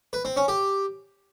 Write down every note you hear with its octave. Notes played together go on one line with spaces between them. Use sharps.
B4
C4
C#4
G4